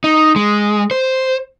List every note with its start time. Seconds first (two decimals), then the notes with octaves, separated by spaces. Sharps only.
0.04 D#4
0.36 G#3
0.91 C5